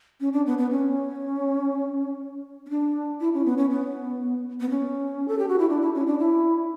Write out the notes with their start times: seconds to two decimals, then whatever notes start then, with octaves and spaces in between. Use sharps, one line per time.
0.20 C#4
0.33 D4
0.46 B3
0.58 B3
0.71 C#4
2.66 C#4
2.70 D4
3.20 E4
3.34 C#4
3.45 B3
3.57 C#4
3.70 B3
4.60 B3
4.70 C#4
5.28 A4
5.39 G4
5.48 F#4
5.59 E4
5.69 D4
5.82 E4
5.95 C#4
6.07 D4
6.19 E4